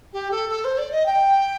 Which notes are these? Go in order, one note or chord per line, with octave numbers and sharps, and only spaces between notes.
G4
A4
A4
C5
D5
D#5
G5